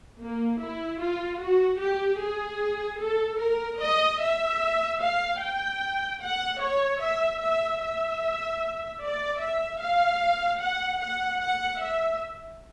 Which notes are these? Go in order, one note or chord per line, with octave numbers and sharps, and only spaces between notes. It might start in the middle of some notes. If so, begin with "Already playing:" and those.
A#3
E4
F4
F#4
G4
G#4
A4
A#4
D#5
E5
F5
G5
F#5
C#5
E5
E5
E5
D5
E5
F5
F#5
F#5
F#5
E5